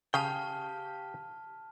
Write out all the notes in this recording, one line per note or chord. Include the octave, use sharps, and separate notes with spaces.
C#3 G4 F5 G5 A5 F6 D#7